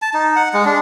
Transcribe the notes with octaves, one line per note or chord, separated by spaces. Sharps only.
A5
D#4
F#5
G#3
D4